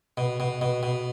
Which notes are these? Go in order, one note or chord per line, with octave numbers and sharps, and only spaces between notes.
B2
B2
B2
B2